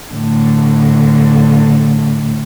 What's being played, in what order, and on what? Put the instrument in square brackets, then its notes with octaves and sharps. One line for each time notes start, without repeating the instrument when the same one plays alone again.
[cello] A2 D3